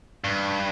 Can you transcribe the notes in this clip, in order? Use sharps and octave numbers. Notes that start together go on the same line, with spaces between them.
G2